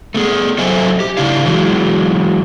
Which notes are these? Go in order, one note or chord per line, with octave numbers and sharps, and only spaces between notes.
A3 B3 G#4
F#3 A4 C5 D#5 E5 G#5
G4
C#3 D4 E4 F5
E3 F#3 G#3